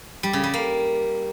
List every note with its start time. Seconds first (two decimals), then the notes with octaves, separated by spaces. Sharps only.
0.23 G3
0.33 C#3
0.43 G3
0.54 A#3